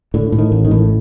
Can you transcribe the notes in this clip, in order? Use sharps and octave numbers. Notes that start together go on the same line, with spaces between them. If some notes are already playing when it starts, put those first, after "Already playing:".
A2 D3
A2
D#3
A1
D#3
A2